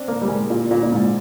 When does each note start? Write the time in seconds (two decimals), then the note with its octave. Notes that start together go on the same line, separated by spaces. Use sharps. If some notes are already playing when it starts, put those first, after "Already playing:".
Already playing: C4 D4
0.08 A#3
0.22 G3
0.28 G#3
0.50 A#2
0.71 A#2
0.83 A#2
0.92 G#2